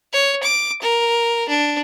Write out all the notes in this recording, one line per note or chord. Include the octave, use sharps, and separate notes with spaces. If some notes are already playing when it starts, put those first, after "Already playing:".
C#5
D6
A#4
D4